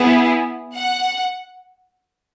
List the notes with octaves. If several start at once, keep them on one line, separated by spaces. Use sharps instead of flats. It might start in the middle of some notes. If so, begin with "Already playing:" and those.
Already playing: B3 E4 G#4
F#5